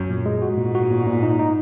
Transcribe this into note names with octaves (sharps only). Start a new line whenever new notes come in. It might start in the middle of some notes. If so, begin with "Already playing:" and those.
Already playing: F#2
A#2
G#3
G#2 F#4
A#2
F#4
A#2
A#2
D#4
D#4